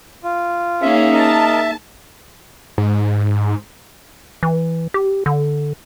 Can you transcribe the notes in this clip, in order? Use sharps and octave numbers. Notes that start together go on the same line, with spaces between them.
F4
A#3 C#4 D#4 G#4 E5 F5
A#4 D#5 A5
G#2
E3
G4
D3